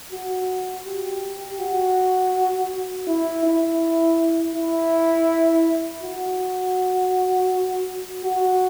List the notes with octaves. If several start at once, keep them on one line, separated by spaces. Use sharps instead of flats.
F#4
G4
F#4
E4
E4
E4
F#4
F#4